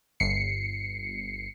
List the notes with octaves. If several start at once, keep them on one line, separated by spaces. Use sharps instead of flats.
G1 C7 C#7